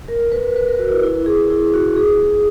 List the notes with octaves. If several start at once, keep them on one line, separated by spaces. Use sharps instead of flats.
A#4
B4
B4
A#4
F#4
E4
E4
G#4
E4
F#4
G#4